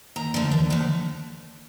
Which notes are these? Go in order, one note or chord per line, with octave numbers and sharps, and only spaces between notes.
D#2 A#5
D3 F3 A3
D#2
D3 F3 A3